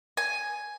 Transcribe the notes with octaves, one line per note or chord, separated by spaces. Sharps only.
G#5